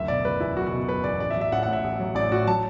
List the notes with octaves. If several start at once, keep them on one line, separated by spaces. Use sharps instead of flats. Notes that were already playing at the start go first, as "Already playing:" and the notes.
Already playing: F#1 D2 E5
B2 D5
F#1 B4
E2 E4
F#1 F#4
F#4
B2
F#1 B4
E2 D5
A1 D5
E5
F#3
E5
A1 F#5
F#5
A2
E5
A1
F#3
A1 D5
A2 F#4
F#3 A5